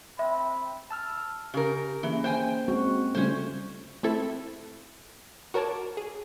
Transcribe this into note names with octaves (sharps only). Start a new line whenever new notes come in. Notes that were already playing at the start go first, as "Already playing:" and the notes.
C4 E5 B5
A5 E6 F6
C#3 G4 A#4
E3 A#3 C#4 G#4
C5 G5 G#5
G#3 C4 F#4
C#3 G3 A3 C#4 F4 C5
A3 C4 E4 A4
F#4 A#4 C#5 A5 D6
G#4